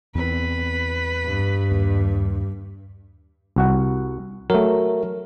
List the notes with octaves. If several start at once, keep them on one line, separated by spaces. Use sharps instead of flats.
E2 C4 B4
G2
D#2
C2 F#4 F#5
F#3 A3 A#4